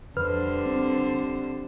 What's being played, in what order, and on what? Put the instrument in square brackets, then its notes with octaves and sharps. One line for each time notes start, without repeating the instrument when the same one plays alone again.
[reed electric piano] F2 B4 F6 [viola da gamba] D3 G3 C5
[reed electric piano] C4